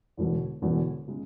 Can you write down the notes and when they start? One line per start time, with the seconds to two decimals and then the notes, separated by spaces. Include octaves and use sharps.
0.17 E1 E2 D3
0.62 E1 E2 D3
1.08 C#3 G#3